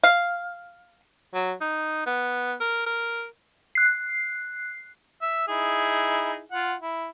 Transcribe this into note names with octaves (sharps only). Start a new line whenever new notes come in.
F5
F#3
D#4
B3
A#4
A#4
F#6 C7
E5
D#4 E4 G#4
F4 F#5
E4